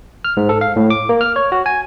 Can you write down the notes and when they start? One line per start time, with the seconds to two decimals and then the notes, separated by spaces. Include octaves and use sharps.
0.25 F6
0.37 G#2
0.49 A4
0.61 F5
0.76 A2
0.90 D6
1.09 A#3
1.21 F6
1.36 C#5
1.52 F#4
1.66 G#5